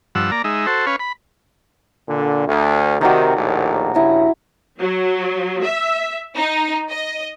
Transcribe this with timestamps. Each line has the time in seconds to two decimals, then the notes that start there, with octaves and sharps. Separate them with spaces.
0.15 G2 F3 F#5 E6
0.31 A#3 D5 A#5
0.44 G#3 D#4 E5
0.66 F#4 A4 C5
0.86 C#4 B4 C#5 F5
0.99 B5
2.08 A#2 D3
2.48 D2
3.01 C3 D#3 F#4 D5 A#5
3.36 A#1 D#2 A2
3.94 G2 C#3 E4 A#5 D#6
4.78 F#3
5.63 E5
6.36 D#4
6.89 D#5